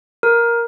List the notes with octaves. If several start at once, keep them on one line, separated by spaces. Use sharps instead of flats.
A#4